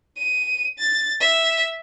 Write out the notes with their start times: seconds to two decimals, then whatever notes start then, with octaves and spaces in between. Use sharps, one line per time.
0.18 D#7
0.79 A6
1.21 E5